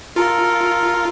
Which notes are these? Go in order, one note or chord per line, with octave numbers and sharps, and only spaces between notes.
F4 A4 A#4